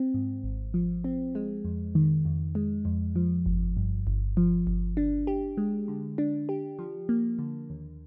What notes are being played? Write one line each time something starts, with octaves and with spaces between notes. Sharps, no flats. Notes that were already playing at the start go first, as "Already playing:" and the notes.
Already playing: C4
G#2
G#1
F3
C4
G#3
F2
D#3
F2
G#3
F2
F3
G1
G2
G1
F3
G1
D4
G4
G#3
D3
D4
G4
F3
A#3
D3
D#2